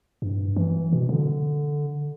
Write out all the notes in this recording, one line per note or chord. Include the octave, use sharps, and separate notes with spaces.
G2
E3
B2
D3